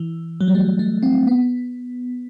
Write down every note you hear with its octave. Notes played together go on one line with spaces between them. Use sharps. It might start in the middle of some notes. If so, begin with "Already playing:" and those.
Already playing: E3
F#3
G3
A3
A3
C4
B3